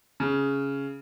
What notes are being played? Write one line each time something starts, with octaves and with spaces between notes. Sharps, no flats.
C#3